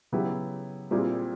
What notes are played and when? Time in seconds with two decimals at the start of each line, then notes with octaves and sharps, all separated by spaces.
0.12 C#3 F#3 B3 E4 G4
0.91 A#2 G3 C4 E4 G#4